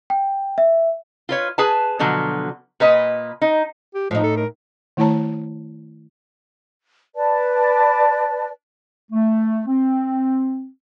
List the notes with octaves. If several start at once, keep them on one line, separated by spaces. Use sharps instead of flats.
G5
E5
F4 B4 C#5
G#4 B4 G#5 A5
B2 D3 F3 F#3
A#2 B4 D#5
D#4
G4
A2 F3 D#4
A4
A#4
D#3 A3 E4 C#5 A5 A#5
B4 D5 A5
A3
C4